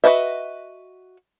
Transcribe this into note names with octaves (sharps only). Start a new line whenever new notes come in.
F#4 A#4 B4 D#5 E5